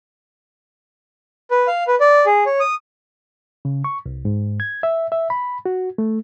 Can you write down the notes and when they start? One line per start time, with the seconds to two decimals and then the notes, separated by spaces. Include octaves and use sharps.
1.51 B4
1.68 F5
1.87 B4
2.00 D5
2.26 G#4
2.46 C#5
2.60 D#6
3.65 C#3
3.84 C#6
4.06 C2
4.25 G#2
4.60 G#6
4.83 E5
5.12 E5
5.30 B5
5.66 F#4
5.98 A3